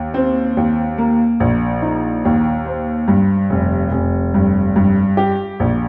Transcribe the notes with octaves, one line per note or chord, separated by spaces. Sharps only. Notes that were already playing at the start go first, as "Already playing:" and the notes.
Already playing: D#2
C4
D#2
A#3
A#1
D#4
D#2
C5
G2
F1
F1
G2
G2
G4
A#1